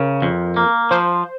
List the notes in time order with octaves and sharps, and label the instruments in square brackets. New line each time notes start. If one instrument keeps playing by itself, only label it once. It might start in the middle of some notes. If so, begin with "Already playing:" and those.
Already playing: [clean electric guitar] C#3 [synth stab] A#4
[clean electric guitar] F2
A#3
[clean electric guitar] F3 [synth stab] C5